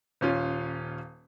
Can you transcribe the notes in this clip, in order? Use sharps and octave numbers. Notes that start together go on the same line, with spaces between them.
D#1 C#4 F4